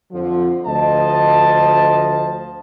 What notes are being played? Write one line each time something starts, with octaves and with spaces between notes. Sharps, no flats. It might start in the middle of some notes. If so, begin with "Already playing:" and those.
F2 D3 F3
D2 F3 D#5 A5